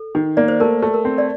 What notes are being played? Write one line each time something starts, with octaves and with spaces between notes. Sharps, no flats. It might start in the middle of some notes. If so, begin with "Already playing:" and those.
Already playing: A4
D#3
A#3 D5
C5
A3 A#4
A3
A#4
C4
D5